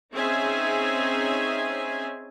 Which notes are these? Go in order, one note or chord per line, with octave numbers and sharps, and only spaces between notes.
C4 C#4 D#4 G#4 E5 G#5